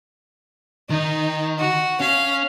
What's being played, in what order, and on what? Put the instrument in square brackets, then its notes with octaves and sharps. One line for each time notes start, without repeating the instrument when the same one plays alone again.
[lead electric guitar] D#3 [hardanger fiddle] D#4
[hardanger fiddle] F#4
[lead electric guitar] C#4 [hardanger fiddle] F5